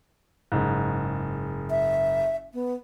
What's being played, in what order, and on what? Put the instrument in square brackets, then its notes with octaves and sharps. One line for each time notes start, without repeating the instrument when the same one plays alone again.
[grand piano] F#1 G#2
[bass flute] E5
B3